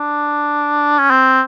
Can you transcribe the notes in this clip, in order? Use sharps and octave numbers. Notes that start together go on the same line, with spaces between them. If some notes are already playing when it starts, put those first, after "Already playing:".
Already playing: D4
C#4
C4